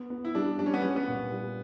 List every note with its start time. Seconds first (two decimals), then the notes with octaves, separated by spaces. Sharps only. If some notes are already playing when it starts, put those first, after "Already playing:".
Already playing: B3
0.10 B3
0.25 E4
0.35 G3 D4
0.59 G3 D4
0.66 C#4
0.74 B3
0.81 G3 C#4
0.96 B3
1.08 A#2
1.32 G3